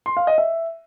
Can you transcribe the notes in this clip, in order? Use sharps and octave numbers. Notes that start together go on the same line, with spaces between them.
C6
F5
D#5
E5